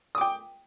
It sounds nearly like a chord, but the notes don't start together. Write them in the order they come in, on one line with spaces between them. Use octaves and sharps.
D#6 D6 G5